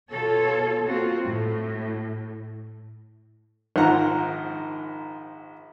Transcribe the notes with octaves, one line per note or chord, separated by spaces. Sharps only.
B2 F4 A4 C#5
A#3 C4 F4 F#4
A2
A#1 G#2 D#3 F4 F#5 A#5